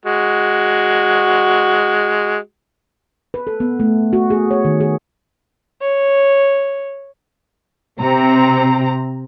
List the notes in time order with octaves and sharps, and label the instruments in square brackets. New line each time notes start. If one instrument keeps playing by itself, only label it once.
[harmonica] G#3 F#4
[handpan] B4
A4
B3
A3
F#4
G#4
C#5
D#3
G#4
[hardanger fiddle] C#5
[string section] C3 C4 A#5